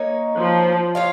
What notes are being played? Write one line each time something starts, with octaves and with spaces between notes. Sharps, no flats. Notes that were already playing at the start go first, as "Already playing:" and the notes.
Already playing: A#3 D#4 C#5
F3
F4 C#5 F5